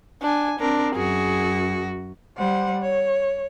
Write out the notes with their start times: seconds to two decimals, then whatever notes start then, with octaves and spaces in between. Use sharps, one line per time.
0.21 D4 G#5
0.60 C4 D4 A#4
0.95 F#2 F#4 G#4
2.37 G3 C5 F#5
2.81 C#5